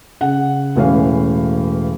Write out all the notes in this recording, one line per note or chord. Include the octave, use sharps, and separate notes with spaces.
C#3 F#5
E1 A2 E3 C#4 F5